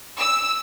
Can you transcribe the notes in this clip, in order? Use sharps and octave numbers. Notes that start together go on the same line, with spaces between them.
E6